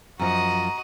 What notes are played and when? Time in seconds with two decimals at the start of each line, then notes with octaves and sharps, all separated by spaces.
0.19 F#2 F3 F#4 D#5 A#5